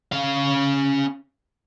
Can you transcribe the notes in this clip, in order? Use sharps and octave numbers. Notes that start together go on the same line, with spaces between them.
C#4 F5